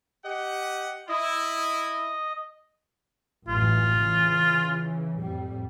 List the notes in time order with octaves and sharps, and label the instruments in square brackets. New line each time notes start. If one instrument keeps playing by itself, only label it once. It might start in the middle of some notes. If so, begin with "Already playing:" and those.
[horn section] G4 D#5 F#5
[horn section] E4 [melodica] D#5
[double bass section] A1 F#2 E3 [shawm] F4
[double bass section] C#3 E3
F2 A2 G3